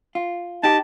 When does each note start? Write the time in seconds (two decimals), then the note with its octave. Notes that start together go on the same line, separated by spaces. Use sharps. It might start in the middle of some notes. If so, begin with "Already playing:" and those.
0.15 F4
0.63 D#4 G4 A5